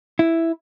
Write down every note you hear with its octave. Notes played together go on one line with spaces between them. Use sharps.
E4